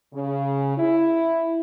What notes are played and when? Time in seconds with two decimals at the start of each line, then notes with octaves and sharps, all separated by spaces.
0.13 C#3
0.78 E4